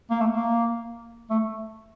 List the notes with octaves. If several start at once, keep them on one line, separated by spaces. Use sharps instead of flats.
A#3
A3
A#3
A3